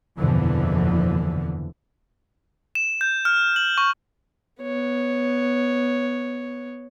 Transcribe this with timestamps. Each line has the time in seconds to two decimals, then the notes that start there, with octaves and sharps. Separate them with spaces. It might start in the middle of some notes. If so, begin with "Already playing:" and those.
0.17 F#1 E2 B2 D3 E3 F3
2.75 E7
3.01 G6
3.25 F6
3.56 F#7
3.78 C#6
4.62 B3 C#5